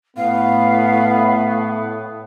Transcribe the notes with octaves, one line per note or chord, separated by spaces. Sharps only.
A2 B3 F5